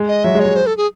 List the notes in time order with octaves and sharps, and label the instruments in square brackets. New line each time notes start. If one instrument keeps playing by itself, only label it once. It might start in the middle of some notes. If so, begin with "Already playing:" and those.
Already playing: [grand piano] G#3
[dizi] D#5
[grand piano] F#3 [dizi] E5
[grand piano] G#3
[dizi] C#5
[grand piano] G#3
[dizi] C5
A4
G#4